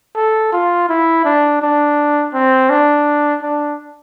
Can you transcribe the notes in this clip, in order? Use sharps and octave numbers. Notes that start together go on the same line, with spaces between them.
A4
F4
E4
D4
D4
C4
D4
D4